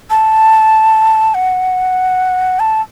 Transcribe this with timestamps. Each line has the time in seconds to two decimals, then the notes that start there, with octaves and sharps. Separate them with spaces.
0.10 A5
1.34 F#5
2.59 A5